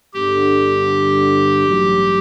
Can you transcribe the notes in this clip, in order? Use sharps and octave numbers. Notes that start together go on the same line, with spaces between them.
G1 G2 D3 G4
A1 G2 F#3